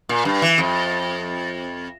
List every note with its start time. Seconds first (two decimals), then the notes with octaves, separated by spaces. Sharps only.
0.09 A#2
0.25 G2
0.42 E3
0.58 F2